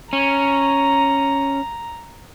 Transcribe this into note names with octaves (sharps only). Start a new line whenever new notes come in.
C#4 A#5